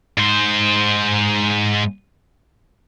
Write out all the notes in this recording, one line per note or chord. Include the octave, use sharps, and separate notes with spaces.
G#2 C5